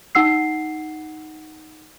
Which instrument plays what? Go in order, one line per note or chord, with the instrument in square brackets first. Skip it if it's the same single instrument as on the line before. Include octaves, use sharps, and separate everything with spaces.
[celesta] D#4 F#5 E6 C7